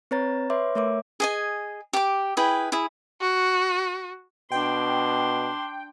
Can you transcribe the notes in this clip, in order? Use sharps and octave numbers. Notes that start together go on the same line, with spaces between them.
C4 B4 C#5 A#5 A6
B4 C#5 E5 C6 D6
A3 A#4 C#5 E5 D6
G#4 D#5 G#5
G4 D6
E4 G#4 B4 G5
E4 G#4
F#4
B2 D4 G5 C6